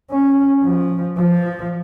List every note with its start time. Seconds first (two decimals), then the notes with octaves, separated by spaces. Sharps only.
0.11 C#4
0.63 F3
1.17 F3